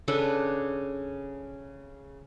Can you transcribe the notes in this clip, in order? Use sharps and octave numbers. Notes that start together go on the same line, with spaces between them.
C#3 D4 A4 B4